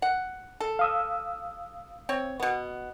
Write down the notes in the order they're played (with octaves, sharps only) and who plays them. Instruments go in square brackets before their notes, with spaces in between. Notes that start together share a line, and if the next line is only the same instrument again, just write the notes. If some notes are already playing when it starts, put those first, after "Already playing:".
[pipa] F#5
A4
[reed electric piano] F5 D#6 E6
[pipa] C4 C#5
B2 B3